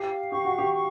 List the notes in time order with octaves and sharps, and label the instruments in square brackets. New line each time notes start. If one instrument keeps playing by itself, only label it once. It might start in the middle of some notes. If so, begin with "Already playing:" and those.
Already playing: [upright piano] G4 [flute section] F5
[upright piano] G4 [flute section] C#6
[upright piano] F#4
G4
[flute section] C#6